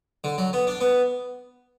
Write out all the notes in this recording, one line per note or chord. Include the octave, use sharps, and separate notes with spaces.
D3
F#3
B3
D4
B3